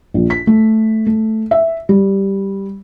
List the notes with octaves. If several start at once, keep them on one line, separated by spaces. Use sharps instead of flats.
A#1
B6
A3
A3
E5
G3